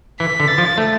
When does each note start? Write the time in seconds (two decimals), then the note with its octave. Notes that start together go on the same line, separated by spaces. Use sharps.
0.20 E3 B6
0.40 D3
0.48 A6
0.58 F3
0.78 A3